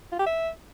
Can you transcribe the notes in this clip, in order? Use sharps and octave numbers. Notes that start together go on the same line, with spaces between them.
F4
G4
E5